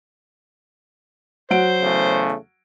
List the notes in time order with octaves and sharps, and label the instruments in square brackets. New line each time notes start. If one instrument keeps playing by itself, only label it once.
[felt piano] F#3 F#5 D7 [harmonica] C5
[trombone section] E2 C#3 A3